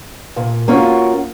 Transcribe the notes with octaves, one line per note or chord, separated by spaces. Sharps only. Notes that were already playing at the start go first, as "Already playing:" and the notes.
A#2
A#3 C#4 D#4 F4 F#4